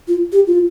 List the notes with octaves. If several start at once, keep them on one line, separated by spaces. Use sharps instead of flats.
F4
G4
F4